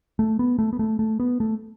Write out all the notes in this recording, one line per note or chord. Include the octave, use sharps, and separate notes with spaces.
A3
B3
A3
B3
A3
A3
B3
A3